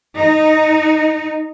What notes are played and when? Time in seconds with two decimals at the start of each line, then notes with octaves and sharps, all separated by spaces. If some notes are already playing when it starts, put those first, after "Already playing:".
0.17 D#4